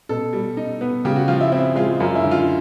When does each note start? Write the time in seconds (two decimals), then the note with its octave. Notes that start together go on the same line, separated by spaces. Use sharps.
0.09 B2 A4
0.33 G3
0.57 D#4
0.81 B3
1.05 C#3 G4
1.16 F#4
1.28 F3 F4
1.41 E4
1.52 C4 E4
1.75 G#3 F4
2.00 F#2 F4
2.15 E4
2.23 D3
2.31 F4